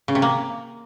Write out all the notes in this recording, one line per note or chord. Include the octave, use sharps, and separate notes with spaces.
C#3
C3
A#3